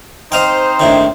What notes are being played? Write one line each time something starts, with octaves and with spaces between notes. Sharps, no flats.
C4 D#4 C5 D#5 F5 G5
A#1 A2 D#3